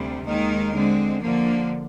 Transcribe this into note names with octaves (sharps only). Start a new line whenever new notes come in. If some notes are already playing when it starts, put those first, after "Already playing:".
Already playing: D2 C3 G3
D#2 D#3 G#3 D#4 A#4
D3 G#3 C4
D3 F3 A#3